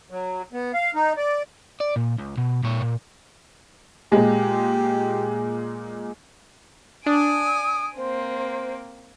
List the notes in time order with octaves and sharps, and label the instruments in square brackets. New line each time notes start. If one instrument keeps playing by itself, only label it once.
[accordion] F#3
B3
F5
D#4
D5
[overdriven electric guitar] D5
A#2
C#2
B2
A#2 C#5
A#2
[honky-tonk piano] A#2 G#3 [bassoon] G4
[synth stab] D4 [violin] G#5 D7 [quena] D#6
[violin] A#3 C4 [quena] C5